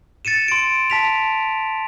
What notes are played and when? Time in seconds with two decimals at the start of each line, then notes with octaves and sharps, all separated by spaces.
0.25 A6 C#7 D#7 E7
0.48 C6 D7
0.90 A5 B6 F7